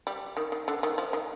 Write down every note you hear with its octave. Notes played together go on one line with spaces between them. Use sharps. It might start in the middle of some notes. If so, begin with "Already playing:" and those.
G3
D#3
D#3
D3
D#3
F3
D#3